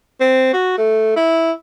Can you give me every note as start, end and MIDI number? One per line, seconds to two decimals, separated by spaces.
0.20 0.53 60
0.53 0.77 66
0.78 1.14 57
1.16 1.52 64